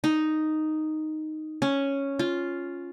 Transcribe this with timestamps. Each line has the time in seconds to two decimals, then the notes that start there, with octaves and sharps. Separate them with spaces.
0.04 D#4
1.62 C#4
2.19 F4